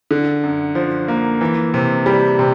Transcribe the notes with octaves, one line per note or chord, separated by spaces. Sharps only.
D3
F#2
F3
A#3
E3
C3
G3
C3